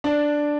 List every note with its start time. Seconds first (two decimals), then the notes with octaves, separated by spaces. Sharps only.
0.04 D4